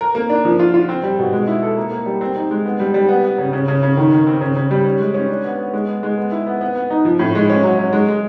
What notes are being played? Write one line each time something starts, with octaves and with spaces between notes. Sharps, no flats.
A#4
A#3
D4
F3
F4
F4
C4
G3
B2
G#3
E4
A4
A#3
A#3
G3
C4
D#4
G#3
B3
G3
G3
B3
B3
C#3
C#3
C#3
C#3
D#3
D#3
C4
C#3
C#3
G3
C#4
G#3
C#4
D4
B3
B3
G#3
B3
G#3
B3
E4
B3
B3
B3
D#4
F3
A2
G#3
C#4
F#3
F#3
G#3
G#3